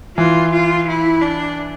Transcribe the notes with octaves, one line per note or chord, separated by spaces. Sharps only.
E3 F4
F4
E4
D4